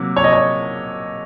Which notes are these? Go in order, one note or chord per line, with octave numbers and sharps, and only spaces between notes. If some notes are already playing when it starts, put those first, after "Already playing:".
Already playing: C3 F#3 A#3
C#5
D#5
C#5